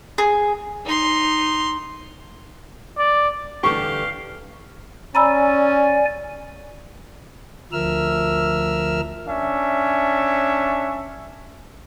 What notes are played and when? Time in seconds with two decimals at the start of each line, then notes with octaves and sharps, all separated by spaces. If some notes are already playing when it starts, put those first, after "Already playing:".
0.18 G#4
0.85 D#4 C6
2.98 D5
3.64 D3 E3 G3 G4 F5 C#6
5.15 C#4 D5 G#5 A#5 B5 E6
7.72 D2 F3 A#4 E5 E6 F6
9.27 C#4 D4 E5